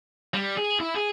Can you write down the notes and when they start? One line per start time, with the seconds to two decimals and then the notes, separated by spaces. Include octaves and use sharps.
0.34 G3
0.57 G#4
0.80 E4
0.96 G#4